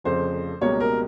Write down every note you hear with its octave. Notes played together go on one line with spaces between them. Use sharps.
F1 F2 C#3 F3 C5
C#2 B2 G3 A#3 C#5
A#4